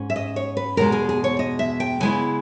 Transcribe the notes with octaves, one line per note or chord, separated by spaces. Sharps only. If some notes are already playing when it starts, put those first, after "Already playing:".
Already playing: G#2 C#4
E5
D#5
C#5
B4
E2 B2 G#3 A#4
G#4
G#4
C#5
D#5
E5
G5
C#3 G#3 B3 E4 G#5